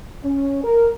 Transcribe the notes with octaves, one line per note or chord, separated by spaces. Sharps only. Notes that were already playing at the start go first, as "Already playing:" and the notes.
C#4
A#4